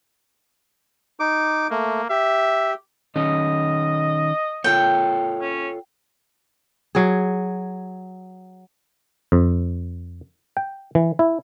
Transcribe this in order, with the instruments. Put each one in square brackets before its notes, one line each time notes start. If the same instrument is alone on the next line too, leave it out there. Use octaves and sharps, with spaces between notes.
[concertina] D#4 D6
[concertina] A3 [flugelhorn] A#3
[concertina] G4 [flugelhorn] E5
[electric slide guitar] D#3 C#4 [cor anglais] D#5
[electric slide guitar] F4 A4 C#5 [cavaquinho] G5
[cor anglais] C#4
[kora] F#3 G#4
[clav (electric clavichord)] F2
G5
E3
E4